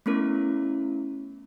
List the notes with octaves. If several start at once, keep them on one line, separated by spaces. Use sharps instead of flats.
A3 B3 C#4 E4 A#4